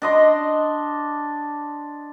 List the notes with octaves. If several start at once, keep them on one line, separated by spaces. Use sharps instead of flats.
D4 D#5 C6